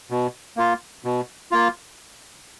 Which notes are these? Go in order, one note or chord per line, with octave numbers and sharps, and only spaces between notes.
B2
A#3 F4
B2
A#3 F4